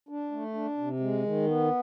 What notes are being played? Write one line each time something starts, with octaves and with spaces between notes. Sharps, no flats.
D4
A3
D4
C3
G#3
D#3
B3